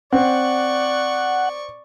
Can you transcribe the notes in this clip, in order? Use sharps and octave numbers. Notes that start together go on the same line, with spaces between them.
C4 D5 F#5 C#6